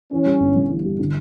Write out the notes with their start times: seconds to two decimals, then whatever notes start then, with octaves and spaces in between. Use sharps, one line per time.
0.12 E3 C#4
0.26 G3
0.41 G1
0.56 G2
0.70 E3
0.85 G3
0.99 D3